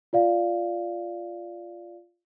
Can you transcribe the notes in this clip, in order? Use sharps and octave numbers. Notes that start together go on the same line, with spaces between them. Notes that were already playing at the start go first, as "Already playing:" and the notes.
F4 D5 F5